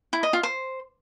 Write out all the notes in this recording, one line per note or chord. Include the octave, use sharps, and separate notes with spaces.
E4
D#5
F4
C5